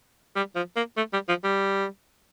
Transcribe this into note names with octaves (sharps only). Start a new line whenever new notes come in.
G3
F3
A#3
A3
G3
F3
G3